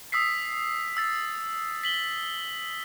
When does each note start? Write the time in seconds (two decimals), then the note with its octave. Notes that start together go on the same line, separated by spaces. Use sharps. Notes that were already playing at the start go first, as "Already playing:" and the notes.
0.12 D#6 E6 B6 C7
0.97 E6 A6 B6
1.84 B6 F#7 G7